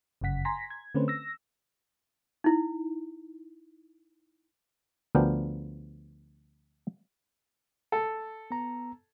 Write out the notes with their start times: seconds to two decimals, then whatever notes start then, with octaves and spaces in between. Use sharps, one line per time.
0.21 G1 F#2 C#3 F#5 B6
0.45 G#5 A#5 C6 A#6 B6
0.70 G#6
0.95 D3 A3 C4 C#4 B4 C5
1.08 E6 A#6
2.44 D#4 E4
5.15 D2 F3 B3 D4 A#4 G5
7.92 A4
8.51 B3 A#5